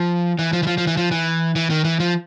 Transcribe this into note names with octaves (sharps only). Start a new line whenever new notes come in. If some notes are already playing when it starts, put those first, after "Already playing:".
Already playing: F3
E3
F3
E3
F3
F3
E3
F3
E3
E3
D#3
E3
F3